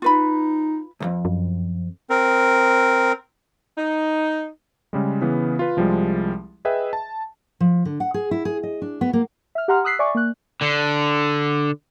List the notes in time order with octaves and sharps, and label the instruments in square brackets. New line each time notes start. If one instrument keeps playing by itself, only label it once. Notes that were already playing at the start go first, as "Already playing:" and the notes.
[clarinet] D#4 [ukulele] F4 B4 B5
[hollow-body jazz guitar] C2 F2
[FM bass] F#2
[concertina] C4 A#4
[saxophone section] D#4
[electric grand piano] C#3 G3 G#3
C#3 E3 B3
F4 B4
C2 F3 G3 G#3
G#4 B4 D#5 E5 G5
A5
[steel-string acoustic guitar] F3
D3
F#5
G#4
E4
G#4
D#5
D4
B3
A#3
[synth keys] E5 F6
G4 F#5 A#5 C6 F6
D#6 E6 F#6 B6 C7
D5 E5 G#5 C#6 D6
A#3 F#6
[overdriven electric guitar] D3